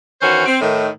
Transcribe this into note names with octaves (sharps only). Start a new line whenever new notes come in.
D#3 E3 C#4 F#4 C5
C4
A2 D#3